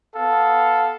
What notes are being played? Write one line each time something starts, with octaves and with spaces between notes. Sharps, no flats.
B3 A4 F5